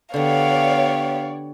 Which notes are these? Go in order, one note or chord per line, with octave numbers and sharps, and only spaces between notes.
D3 B3 D4 G4 C#5 D5 F5